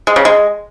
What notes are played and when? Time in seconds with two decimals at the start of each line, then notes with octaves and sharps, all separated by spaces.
0.07 G#3
0.16 C#3
0.25 G#3